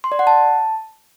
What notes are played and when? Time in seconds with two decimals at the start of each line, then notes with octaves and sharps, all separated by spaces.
0.04 C6
0.12 D5
0.19 F#5
0.27 A5